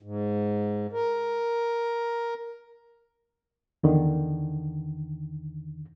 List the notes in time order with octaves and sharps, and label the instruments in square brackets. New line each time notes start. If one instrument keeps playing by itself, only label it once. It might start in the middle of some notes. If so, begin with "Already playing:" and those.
[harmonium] G#2
A#4
[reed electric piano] E2 D3 D#3